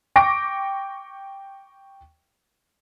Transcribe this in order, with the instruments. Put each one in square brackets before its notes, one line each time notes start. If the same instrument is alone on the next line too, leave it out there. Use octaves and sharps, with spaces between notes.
[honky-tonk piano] G5 C#6 D6 A#6 D7